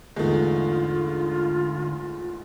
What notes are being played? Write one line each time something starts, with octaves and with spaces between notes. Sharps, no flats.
E2 G#2 D3 G#3 A3 F4